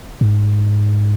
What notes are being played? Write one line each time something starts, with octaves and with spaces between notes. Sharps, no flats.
G#2